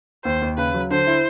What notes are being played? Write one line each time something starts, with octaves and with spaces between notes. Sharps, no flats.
D#2 C5
D#2
C#3 B4
F#3
D3 C5
E4